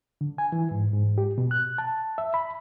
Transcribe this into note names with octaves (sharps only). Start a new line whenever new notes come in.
D3
G#5
E3
G#2
G#2
G4
B2
F#6
A5
E5
B5